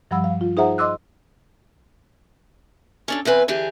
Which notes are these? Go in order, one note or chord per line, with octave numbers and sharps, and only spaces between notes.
G2 F3 G3 F#5 B5 E6
F5
F4
D#4 G#4 C5 E5 F#5 A#5
D#5 C6 D6 E6 F#6
C#4 D4 A4
E2 C4 B4 G#5
D3 E3 G4 G#4